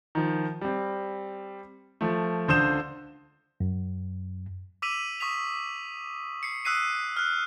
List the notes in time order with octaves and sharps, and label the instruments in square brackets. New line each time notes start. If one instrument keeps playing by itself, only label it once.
[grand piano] D#3 F3
G3 C4
F3 A3
C#2 D3 C5 D#6 G6 E7
[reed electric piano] F#2
[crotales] D6 E6 B6 D#7 F7 F#7
C#6 D#6 B6 F7
C7 C#7
D#6 E6 F#6 B6 C7 D#7
F6 F#6